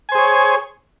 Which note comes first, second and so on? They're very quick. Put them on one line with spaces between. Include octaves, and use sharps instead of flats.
G#5 C5 G#4 C#5